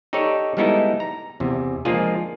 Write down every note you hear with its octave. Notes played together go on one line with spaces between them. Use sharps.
D#4 G4 A4 C#5 D5
G3 G#3 B3 D#4 E4 A4
A#5
E2 C3
F3 G#3 A#3 D4 F4 G#4